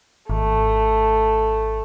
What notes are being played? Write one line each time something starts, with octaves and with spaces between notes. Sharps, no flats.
G#1 A3